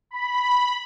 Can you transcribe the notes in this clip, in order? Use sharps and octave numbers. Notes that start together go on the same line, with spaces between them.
B5